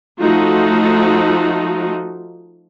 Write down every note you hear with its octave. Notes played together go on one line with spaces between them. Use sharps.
F3 A3 D#4 F4 F#4